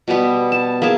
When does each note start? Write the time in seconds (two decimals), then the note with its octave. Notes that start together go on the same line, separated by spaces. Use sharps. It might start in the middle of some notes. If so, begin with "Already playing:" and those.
0.08 B2 G3 B3
0.52 A5
0.82 A#3 E4 G#4 A5